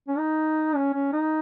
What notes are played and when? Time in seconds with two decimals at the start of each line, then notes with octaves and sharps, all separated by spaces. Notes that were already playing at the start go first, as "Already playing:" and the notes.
0.08 C#4
0.18 D#4
0.75 C#4
0.94 C#4
1.13 D#4